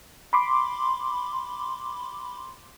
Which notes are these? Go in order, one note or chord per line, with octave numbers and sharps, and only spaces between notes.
B5 C6 D6